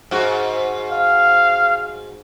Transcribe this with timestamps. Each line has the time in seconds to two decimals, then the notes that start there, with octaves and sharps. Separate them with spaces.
0.11 G#2 F#4
0.92 F5